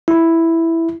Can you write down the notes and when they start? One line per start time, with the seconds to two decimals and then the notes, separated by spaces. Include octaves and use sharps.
0.08 E4